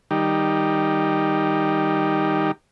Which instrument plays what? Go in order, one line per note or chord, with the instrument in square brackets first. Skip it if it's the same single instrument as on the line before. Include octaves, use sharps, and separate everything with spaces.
[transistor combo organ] D#3 G3 D#4 G4